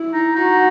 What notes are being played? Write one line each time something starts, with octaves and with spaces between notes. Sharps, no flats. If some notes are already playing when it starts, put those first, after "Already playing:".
Already playing: E4
D#4
D#4 F#4